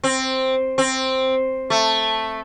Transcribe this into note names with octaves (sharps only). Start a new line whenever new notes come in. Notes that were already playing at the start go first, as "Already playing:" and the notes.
C4
C4
A3